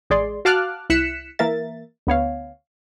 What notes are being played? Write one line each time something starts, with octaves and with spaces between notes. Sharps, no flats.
A1 G#3 G#4 D5 C6
F#4 F5 A5 D6 F6 F#6
C2 E4 F#6 B6 C#7 E7
E3 A#3 A#4 E5 A6
D2 B3 C#5 F5